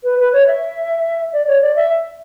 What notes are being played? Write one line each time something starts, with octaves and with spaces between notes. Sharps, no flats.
B4
B4
C#5
E5
D5
C#5
D5
E5